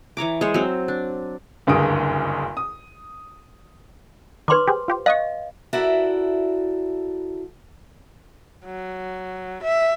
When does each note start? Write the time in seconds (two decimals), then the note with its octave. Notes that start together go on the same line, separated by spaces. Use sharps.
0.17 E3 C#5 A#5 D6
0.41 G#3 C5 C#5
0.54 F#3 C4
0.88 D4
1.67 F#1 D2 G2 G#4 D#6 D7
2.57 D#6
4.48 D#3 B4 C#5 C6 D6
4.68 G4 G#4 C5
4.88 F4 G4 C5
5.06 D#5 F5 C#6 D#6 F#6
5.73 E4 F#4 A4 A#4 D5 E5
8.65 F#3
9.63 E5